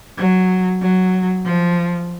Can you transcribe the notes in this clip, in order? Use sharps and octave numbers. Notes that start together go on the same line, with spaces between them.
F#3
F#3
F3